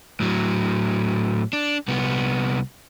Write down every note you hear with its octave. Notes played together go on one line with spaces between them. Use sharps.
A2 F#3
D4
C2 B3